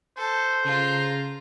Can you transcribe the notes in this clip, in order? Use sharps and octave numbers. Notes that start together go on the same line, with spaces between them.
A4 C5
C#3 F4 A#5